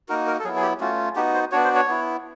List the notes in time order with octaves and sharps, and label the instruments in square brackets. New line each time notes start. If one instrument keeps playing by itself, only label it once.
[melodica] A#3 D#4 F#4 A#4
A#4
A4
F#3 B3 E4 G#4
G#4
G4
A3 C#4 F4 F#4
B3 D#4 F#4 G4
C5
B3 D4 F#4 C#5
C5
C#5
B3 E4